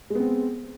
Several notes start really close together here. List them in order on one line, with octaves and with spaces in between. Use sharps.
G#3 B3 C4